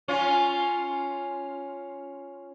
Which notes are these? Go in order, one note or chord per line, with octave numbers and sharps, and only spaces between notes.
C#4 F4